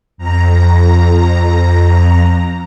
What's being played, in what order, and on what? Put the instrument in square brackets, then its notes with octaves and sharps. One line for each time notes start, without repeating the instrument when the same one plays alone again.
[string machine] F2 A#5